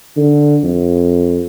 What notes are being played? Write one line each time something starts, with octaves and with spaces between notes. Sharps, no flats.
D3
F2